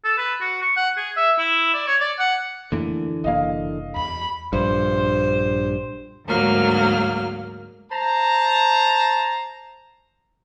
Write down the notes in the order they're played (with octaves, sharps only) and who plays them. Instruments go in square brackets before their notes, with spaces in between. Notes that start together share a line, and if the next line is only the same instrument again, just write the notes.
[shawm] A4
B4
F#4
C#6
F#5
G#4
E5
E4
D5
C#5
D5
F#5
[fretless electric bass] F2 A3 A#3 [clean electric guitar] D3 E3
[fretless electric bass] F#1 C2 A#3 [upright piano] D#5 F5
[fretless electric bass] E2 [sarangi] B5
[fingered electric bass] A#1 G2 [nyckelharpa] C5
[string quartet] D2 G#2 F#3 A#3 F6
[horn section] C5 A5 A#5